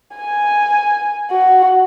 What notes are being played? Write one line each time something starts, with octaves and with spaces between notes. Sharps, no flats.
G#5
F#4